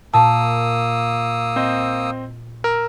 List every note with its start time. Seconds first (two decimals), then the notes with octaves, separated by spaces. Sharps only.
0.14 A#2 A#3 A5 D#6 E6
1.56 C4 C5 D#5
2.64 A#4 E6